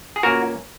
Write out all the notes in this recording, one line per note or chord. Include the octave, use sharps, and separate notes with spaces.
G#4
A#2 A#3 C#4 F#4 A#4